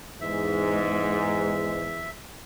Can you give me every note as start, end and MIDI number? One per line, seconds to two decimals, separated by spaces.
0.21 2.19 40
0.21 1.83 44
0.21 1.96 56
0.21 2.10 76